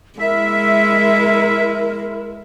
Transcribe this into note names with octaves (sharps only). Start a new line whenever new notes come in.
G#3 E4 A#4 E5